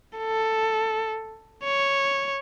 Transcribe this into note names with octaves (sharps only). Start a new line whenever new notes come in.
A4
C#5